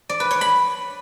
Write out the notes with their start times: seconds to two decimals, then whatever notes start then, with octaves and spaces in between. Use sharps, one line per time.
0.09 D5
0.20 B4
0.31 C#5
0.41 B5